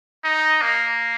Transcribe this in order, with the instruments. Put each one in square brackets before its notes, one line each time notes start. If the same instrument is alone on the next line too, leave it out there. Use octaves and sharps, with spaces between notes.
[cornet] D#4
A#3